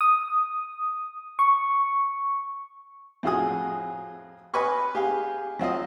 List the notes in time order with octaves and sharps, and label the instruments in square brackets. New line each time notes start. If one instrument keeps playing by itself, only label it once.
[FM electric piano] D#6
C#6
[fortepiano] F2 A2 F4 F#4 G#4 D#6
B4 D#5 G#5 B5 C#6 F6
G4 G#4 F5
F#3 C4 F4 D#5